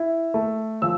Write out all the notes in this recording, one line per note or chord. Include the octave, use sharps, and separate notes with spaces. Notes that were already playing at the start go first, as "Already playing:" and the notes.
Already playing: E4
A3
F3 E6